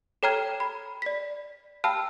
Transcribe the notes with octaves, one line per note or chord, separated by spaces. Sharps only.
A4 C#5 G5 A#5 F6 G#6
B5
D5 B6
F5 G5 A5 B5 E6 F6